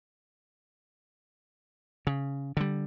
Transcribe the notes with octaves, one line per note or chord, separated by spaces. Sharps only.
C#3
D3 G3